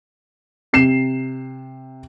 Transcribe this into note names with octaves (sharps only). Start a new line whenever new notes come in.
C3 C7 E7